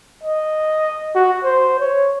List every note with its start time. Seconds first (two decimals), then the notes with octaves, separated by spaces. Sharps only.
0.23 D#5
1.15 F#4
1.44 C5
1.80 C#5